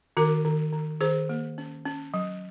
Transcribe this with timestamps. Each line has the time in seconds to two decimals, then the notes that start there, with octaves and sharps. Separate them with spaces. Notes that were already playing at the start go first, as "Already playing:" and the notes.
0.17 D#3 F#4 A#4
0.45 D#3
0.72 D#3
1.01 D#3 G#4 C5
1.29 A#3
1.58 C#4
1.85 C#4
2.14 F#3